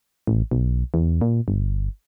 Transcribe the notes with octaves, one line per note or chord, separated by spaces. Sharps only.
A1
B1
E2
A#2
G1